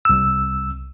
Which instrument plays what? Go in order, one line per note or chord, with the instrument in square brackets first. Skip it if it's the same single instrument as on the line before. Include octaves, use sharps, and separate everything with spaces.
[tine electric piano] C2 E6